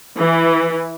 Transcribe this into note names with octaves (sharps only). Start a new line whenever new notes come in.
E3